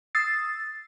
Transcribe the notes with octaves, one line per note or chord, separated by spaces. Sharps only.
D#6 E6 A6 C7